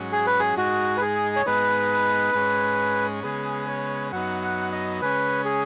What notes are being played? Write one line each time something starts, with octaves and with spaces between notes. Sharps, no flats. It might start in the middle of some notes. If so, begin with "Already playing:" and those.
Already playing: G#2 F#3 C#4
G#4
B4
G#4
G#2 G#3 D#4 F#4
B4
G#4
C#5
G#2 G#3 B3 D#4 B4
G#2 G#3 C#4
C#3 G#3 B3 G#4
C#5
F#2 F#3 B3 D#4 F#5
F#5
D#5
C#3 G#3 C#4 B4
G#4